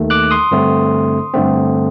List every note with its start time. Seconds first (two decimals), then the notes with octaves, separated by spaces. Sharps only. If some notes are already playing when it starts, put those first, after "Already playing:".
Already playing: D#2 D#3 A3
0.10 D6 F#6
0.31 C6 D#6
0.51 G2 D3 A3 C4
1.34 G2 D3 A3 C4